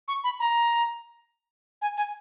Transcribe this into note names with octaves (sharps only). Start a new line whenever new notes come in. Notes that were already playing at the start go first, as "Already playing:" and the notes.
C#6
B5
A#5
G#5
G#5